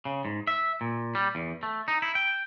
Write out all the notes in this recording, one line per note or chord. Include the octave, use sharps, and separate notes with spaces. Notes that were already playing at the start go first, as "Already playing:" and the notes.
C#3
G#2
E5
A#2
G3
E2
A3
D#4
E4
G5